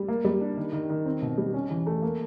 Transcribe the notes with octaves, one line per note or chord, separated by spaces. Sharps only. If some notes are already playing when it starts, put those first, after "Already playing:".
Already playing: G3
A#3
G3
D4
D#3
D#3
D#3
C4
B2
G3
C#4
E3
A3
A#3